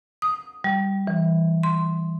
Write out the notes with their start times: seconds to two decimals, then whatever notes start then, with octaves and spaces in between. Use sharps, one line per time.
0.22 D#6
0.64 G3
1.07 E3
1.63 C6